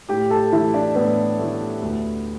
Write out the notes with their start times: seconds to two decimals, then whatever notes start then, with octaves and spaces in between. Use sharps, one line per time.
0.09 A2 G4 G5
0.30 A4 A5
0.52 E3 A3 E4 E5
0.74 D4 D5
0.95 A2 B3 B4
1.39 E3 A3
1.82 D2